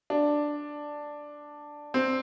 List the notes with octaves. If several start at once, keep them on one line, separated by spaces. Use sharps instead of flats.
D4
C4